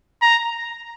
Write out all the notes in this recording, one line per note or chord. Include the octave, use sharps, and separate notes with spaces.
A#5